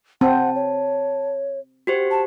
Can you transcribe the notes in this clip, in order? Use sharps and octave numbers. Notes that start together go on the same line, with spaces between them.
C4 F#5 A5
C#5
F#4 G4 C5
A5